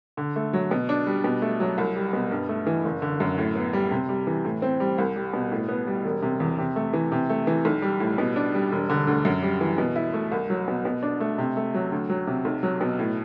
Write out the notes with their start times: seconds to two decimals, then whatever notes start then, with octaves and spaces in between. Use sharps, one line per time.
0.17 D3
0.36 A3
0.53 F#3
0.71 B2
0.89 D4
1.07 G3
1.24 B2
1.42 A3
1.60 F#3
1.78 C2
1.96 G3
2.13 B2
2.31 G2
2.49 A3
2.67 E3
2.85 F#1
3.02 D3
3.20 F#2
3.38 A2
3.56 B3
3.73 G3
3.91 C3
4.09 G3
4.27 E3
4.45 A2
4.62 C4
4.80 G3
4.98 C2
5.16 G3
5.33 B2
5.52 A2
5.69 B3
5.87 G3
6.05 E1
6.22 C3
6.40 E2
6.58 C3
6.76 A3
6.93 E3
7.12 C3
7.30 A3
7.47 E3
7.65 B1
7.82 G3
8.00 A2
8.18 B2
8.36 D4
8.54 G3
8.72 E1
8.90 D3
9.07 D2
9.25 F#2
9.43 G3
9.61 E3
9.78 B2
9.96 E4
10.14 A3
10.32 C2
10.50 F#3
10.68 B2
10.85 B2
11.03 D4
11.20 A3
11.38 C3
11.57 A3
11.74 F#3
11.92 D2
12.09 F#3
12.27 C3
12.45 B1
12.63 F#3
12.81 B2
12.99 A2